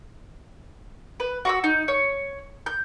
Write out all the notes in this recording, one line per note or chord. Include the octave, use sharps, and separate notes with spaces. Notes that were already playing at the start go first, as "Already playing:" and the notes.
B4
F#4 C#6 E6
D#4
C#5
G6